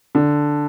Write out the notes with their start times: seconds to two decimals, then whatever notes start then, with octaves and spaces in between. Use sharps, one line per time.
0.15 D3